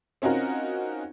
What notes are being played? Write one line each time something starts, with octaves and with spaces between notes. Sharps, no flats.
C4 C#4 D#4 F4 F#4 A#4